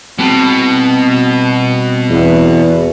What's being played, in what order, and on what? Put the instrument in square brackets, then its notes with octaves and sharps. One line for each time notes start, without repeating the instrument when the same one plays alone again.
[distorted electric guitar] B2 [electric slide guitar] G3 C4 A5
[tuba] E2